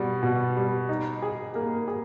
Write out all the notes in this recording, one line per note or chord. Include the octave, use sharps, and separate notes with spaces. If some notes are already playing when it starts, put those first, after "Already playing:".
Already playing: B2 G3
B2
G3
D#4
G#4
A#3
G#4